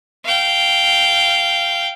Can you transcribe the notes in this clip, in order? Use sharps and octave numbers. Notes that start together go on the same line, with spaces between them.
F5 G5